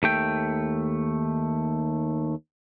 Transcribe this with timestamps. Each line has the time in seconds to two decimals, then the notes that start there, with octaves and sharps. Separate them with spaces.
0.03 D#2 A3 G5